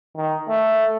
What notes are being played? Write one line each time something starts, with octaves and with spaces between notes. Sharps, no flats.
D#3
A3